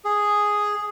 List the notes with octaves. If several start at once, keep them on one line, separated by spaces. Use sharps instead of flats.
G#4